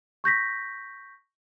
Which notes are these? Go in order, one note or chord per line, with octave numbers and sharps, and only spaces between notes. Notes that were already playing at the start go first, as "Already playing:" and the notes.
C#6 G6 A#6 B6